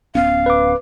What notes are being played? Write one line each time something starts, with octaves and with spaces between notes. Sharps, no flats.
D1 B3 C#4 F5
B4 D6